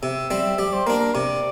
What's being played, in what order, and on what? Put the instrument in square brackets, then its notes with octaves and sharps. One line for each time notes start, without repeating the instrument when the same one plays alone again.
[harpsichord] C3 [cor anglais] E5
[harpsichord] G3 C4
[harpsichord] G3 [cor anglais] D5
[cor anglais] C5
[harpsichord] A#3 D4 [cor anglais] A#4
[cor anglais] A#4
[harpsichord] C3 [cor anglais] D5